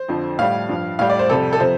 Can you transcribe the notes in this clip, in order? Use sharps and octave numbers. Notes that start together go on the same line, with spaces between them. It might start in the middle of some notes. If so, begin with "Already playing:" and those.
Already playing: C5
F2 D3 F3
A2 G3 F5
G2 F3
A2 G3 F5
D5
C5
F2 C3 G3 A4
A4
C3 F3 C5